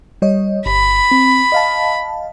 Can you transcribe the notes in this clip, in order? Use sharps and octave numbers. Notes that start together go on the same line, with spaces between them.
G3 C#5 D#5
G1 B5
C4
D#5 F5 A5